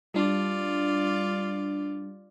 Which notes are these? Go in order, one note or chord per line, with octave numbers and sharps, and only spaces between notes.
G3 D4 F4 D5